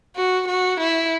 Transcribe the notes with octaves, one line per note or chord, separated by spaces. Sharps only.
F#4
F#4
E4